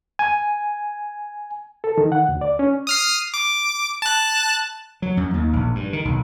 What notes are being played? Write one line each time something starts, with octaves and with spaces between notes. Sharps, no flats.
G#5
A4
D#3
F#5
D2
D5
C#4
D#6 F6 C7
D6
A5 F#6
F#3
F#2
D#2
A#1
G2
D#3
B1